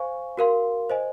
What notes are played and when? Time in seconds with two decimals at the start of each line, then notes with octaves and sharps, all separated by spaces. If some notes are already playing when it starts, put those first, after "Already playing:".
Already playing: C5 F5 G#5 C#6
0.37 F#4 A#4 F5 C6
0.90 C5 D#5 G#5